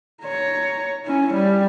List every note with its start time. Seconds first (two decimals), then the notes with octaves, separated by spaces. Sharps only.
0.23 C#5 A#5
1.05 C#4 E4
1.34 G3